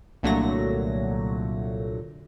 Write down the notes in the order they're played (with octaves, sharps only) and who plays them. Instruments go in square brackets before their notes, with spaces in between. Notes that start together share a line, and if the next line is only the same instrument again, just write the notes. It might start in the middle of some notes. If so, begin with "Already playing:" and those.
[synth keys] C2 A#2 D3 F#3 A3 A#6